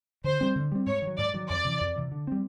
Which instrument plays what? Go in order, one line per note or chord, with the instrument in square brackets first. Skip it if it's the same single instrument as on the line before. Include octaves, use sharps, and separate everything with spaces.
[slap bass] D3 [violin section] C5
[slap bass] G3 C4
D3
G3 C4
[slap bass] G#2 [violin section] C#5
[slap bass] D#3
F#3
[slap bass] G#2 [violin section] D5
[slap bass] D#3 F#3
[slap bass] F2 [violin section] D5
[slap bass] C3 E3
F2
C3 E3
D3
G3 C4